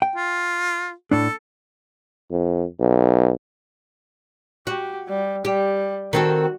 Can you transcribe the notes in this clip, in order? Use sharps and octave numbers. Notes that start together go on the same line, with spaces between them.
G5
F4
A2 D4 A4
F2
B1
F#4 G4
G3
G3 G4
D#3 C4 F#4 A4